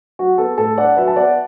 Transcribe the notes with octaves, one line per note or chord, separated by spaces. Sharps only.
F#3 F#4
B3 A4
A2 A4
D4 D5 F#5
F#3 B4 E5
A5
B3 D5 F#5